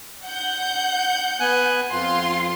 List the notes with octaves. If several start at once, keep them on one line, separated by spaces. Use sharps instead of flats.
F#5 G6
B3 G#5 F#6
F2 F4 C6